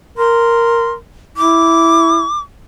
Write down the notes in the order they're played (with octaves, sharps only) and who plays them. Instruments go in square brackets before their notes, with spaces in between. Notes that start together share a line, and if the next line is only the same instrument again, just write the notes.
[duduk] A#4 [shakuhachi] C6
[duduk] E4 [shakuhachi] D6